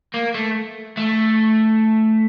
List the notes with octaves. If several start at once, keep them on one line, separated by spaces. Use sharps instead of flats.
A#3
A3
A3